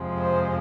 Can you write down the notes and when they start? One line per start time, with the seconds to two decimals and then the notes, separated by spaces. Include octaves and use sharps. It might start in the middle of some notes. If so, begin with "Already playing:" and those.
Already playing: F2 C3 F3 G#3
0.18 C5